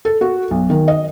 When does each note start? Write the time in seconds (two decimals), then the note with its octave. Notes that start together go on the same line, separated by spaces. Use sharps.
0.05 A4
0.21 F#4
0.51 B1
0.70 D#3
0.88 D#5